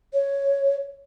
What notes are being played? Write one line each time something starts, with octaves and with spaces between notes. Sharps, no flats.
C#5